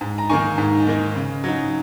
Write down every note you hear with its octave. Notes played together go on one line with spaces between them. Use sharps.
G#2
A#5
D#3 A#3 D#4 G#5 C#6
G#2
D#3 A#3 D#4
C#3
F#3 D#4